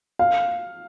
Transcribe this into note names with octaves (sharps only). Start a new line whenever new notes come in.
F5